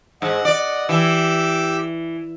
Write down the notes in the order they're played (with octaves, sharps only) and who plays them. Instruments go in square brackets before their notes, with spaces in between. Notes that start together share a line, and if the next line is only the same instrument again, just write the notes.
[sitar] G#2 [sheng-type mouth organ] D#5 F#5
[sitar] D5
[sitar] E3 [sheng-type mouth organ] G4 D6 E6